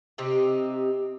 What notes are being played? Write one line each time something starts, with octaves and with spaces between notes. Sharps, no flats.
C3 C4 D#4 G4